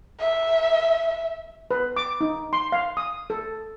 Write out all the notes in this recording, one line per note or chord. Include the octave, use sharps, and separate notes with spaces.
E5
B4
D6
D#4
C6
F5
D#6
A4